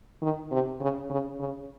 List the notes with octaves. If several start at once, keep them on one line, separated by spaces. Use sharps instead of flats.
D#3
C3
C#3
C#3
C#3